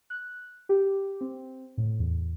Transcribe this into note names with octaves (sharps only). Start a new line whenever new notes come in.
F#6
G4
C4
A2
E2